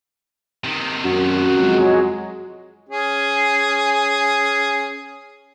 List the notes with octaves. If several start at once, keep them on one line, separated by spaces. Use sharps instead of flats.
C3 D#3
F#2 F#4
F2 F#3 G#3
C#4 G#4